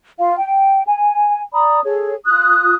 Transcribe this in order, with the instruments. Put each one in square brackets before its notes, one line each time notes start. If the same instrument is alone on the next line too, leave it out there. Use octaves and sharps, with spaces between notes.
[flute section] F4 F5
G5
G#5
D5 A#5 B5 D#6
G#4 A4 C#5
F4 D#6 F#6